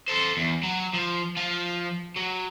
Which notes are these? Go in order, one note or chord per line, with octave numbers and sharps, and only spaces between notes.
A4 C5
E2
F#3
F3
F3 F4
F#3